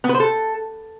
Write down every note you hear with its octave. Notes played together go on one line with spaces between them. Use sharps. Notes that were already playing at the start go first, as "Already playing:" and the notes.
B3
B4
C5
A4